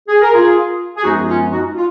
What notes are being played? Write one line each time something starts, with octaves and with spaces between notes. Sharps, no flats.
G#4
A#4
F4 G#4
G#4
F#2 F3 G#3 B3 D#4 F#4
C#4 F4
D#4 F#4
F4